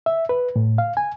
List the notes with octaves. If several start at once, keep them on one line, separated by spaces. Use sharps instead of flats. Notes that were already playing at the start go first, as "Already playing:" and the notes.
E5
B4
A2
F5
G#5